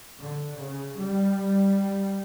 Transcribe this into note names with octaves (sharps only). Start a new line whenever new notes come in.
D3
C#3
G3